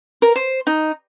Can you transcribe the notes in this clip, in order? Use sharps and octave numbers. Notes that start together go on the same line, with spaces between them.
A#4
C5
D#4